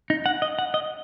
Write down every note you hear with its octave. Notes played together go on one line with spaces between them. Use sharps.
D#4
F#5
D#5
F#5
D#5